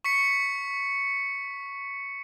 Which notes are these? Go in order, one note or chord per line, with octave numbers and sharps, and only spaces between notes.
C#6 B6 C#7